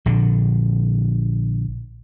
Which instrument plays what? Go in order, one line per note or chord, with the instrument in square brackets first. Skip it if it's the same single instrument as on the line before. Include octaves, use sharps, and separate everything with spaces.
[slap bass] A#1 D3